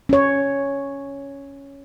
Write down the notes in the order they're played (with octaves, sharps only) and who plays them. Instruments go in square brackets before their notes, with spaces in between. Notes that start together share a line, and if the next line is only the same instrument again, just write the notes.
[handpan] C#4 C#5